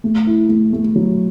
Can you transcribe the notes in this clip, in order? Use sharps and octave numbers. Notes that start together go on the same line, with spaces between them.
A3
E4
A3
A3
F#3